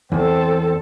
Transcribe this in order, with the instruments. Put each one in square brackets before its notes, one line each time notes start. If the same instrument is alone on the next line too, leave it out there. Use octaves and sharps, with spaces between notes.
[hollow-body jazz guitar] E2 [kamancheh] C4 A4